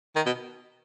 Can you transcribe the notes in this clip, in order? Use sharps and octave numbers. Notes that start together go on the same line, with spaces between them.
D#3
B2